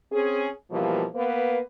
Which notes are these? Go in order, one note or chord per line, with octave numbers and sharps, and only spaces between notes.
C4 C#4 G#4
B2 E3 F3 G3 A#3
A#3 B3 B4